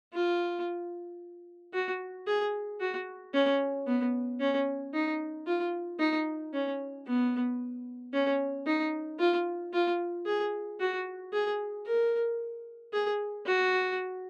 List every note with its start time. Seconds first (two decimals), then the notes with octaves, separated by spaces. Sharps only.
0.14 F4
1.74 F#4
2.27 G#4
2.80 F#4
3.34 C#4
3.87 B3
4.40 C#4
4.94 D#4
5.47 F4
5.99 D#4
6.53 C#4
7.07 B3
8.13 C#4
8.67 D#4
9.19 F4
9.73 F4
10.26 G#4
10.80 F#4
11.33 G#4
11.86 A#4
12.93 G#4
13.46 F#4